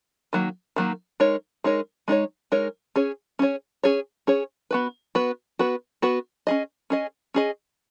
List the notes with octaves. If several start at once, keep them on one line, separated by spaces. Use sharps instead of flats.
D#3 F#3 A#3
D#3 F#3 A#3
G#3 D#4 A#4 C#5
G#3 D#4 A#4 C#5
G#3 D#4 A#4 C#5
G#3 D#4 A#4 C#5
C#4 G#4 C#5
C#4 G#4 C#5
C#4 G#4 C#5
C#4 G#4 C#5
B3 F#4 B4
B3 F#4 B4
B3 F#4 B4
B3 F#4 B4
C#4 G#4 D#5
C#4 G#4 D#5
C#4 G#4 D#5